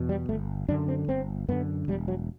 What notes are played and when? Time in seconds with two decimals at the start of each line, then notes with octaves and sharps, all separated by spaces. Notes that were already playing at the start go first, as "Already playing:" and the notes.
Already playing: E2 B2
0.09 G3
0.29 G1 A3
0.68 F#2 D4
0.72 D3
0.88 C4
1.08 G1 C4
1.48 F#2 D3 B3
1.88 E1 G3
2.08 F#3